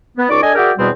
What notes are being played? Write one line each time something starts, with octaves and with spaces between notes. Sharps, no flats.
B3
C#2 D#4 D5 C#6 D6
D4 A4 D#5 G#5
F#4 G#4 A#4 D5 E5 G5
E2 B2 G3 B3 C4